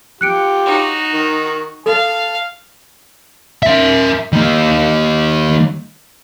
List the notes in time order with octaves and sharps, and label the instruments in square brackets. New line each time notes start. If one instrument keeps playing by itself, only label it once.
[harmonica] F4 G4 [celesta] F#6 C#7 D7
[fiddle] D#4 F#4
[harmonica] D#3
[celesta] A4 [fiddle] F5 [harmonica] A5
[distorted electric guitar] A#4 E5
D#3 A#3